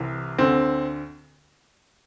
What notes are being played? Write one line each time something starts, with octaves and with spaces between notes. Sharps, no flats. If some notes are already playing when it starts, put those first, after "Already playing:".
Already playing: C2 C3 E3
D2 D3 C4